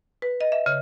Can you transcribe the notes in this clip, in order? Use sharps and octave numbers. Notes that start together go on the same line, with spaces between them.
B4
D#5
E5
C#3